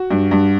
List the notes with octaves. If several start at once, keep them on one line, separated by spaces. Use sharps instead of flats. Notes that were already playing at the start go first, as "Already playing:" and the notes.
Already playing: F#4
G2
G2